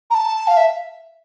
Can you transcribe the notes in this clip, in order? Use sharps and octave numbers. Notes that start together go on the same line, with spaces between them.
A#5
A5
F5
E5